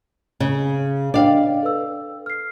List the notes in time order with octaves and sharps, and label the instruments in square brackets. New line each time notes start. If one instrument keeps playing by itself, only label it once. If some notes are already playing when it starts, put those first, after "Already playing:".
[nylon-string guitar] C#3
[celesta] D4 D#5 G5 [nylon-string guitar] D5 F5
[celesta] A4 B4 E6
F6 C7